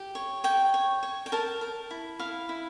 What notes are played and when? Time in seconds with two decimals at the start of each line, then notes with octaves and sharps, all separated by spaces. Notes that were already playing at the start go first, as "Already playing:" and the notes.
Already playing: G4
0.15 C#5
0.44 C#5 G5
0.74 C#5
1.03 C#5
1.26 G5
1.32 A#4 A5
1.61 A#4
1.91 E4
2.19 E4 F5
2.49 E4